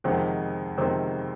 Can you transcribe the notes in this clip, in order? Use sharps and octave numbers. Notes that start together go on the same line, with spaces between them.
F2 C3 D#3 G#3 C4 F#5
F2 C3 D#3 G#3 C4